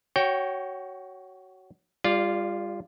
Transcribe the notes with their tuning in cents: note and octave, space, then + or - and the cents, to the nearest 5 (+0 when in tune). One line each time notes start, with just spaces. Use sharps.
F#4 +20 C#5 +0 G5 +0
G3 +30 F4 -10 D5 +0